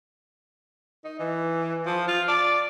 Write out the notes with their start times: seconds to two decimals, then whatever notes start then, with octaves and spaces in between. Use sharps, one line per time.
1.04 D#4
1.19 E3
1.86 F3
2.08 F4
2.28 D5